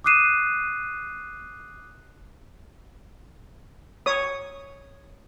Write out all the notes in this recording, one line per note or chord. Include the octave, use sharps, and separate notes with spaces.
D6 D#6 F#6 C7 D#7 E7
C#5 D#6